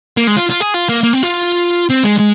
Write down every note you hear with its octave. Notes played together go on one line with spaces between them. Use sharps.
A#3
G#3
F4
F4
G#4
F4
A#3
A#3
C4
F4
C4
G#3
G#3